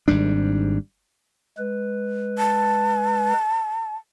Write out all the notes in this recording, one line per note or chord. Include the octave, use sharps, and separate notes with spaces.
G#1 G#2 G3 D4
G#3 B4
A5